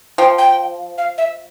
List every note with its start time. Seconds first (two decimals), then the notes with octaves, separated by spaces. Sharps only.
0.18 F3 G5
0.38 G5
0.98 F5
1.18 E5